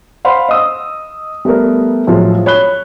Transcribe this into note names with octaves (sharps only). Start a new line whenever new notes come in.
C5 F5 F#5 B5 C6
D#5 D#6 E6
G3 A3 B3 A#4
A2 F3 F#3 G#3 F4
C#5 B5 F#6 G7